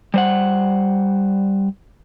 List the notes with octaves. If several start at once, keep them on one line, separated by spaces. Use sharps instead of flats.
G3 C5 F#5